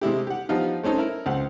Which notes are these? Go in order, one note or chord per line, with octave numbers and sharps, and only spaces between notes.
C3 G#3 E4 G4
G4 F#5
F3 G3 B3 D#4 F4
A3 C4 C#4 D#4 A4
E4 A#4
C#2 C4 F#5